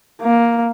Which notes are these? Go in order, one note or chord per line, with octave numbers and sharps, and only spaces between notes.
A#3